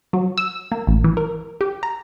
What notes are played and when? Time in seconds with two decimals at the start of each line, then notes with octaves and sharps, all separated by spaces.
0.13 F#3
0.38 E6
0.72 A#3
0.87 A1
1.04 E3
1.17 A#4
1.61 G4
1.83 A#5